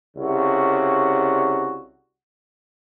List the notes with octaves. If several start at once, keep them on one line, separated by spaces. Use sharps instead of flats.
C2 C#3 F#4